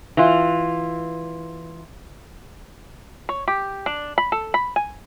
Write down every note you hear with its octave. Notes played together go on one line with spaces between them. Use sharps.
E3 F4
C#5
G4
D4
B5
A4
B5
G#5